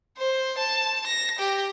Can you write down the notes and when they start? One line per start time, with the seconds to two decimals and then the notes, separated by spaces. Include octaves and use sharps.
0.17 C5
0.58 A5
1.07 A#6
1.39 G4